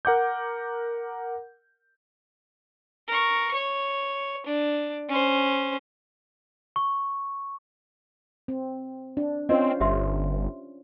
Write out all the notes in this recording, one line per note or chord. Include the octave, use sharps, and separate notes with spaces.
A#4 F#5 D6 G6
A#4 C#6
C#5
D4
C#4 C5
C#6
C4
D4
C4 C#4 F4 C5 D#5
G1 G4 E5 C6